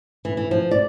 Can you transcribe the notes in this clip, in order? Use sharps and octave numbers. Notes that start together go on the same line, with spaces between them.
E3
E3
F3
D5